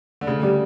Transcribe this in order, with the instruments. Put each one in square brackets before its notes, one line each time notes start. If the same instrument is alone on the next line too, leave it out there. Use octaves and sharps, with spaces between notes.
[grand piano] D3
[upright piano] D2 [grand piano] C#3
[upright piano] G3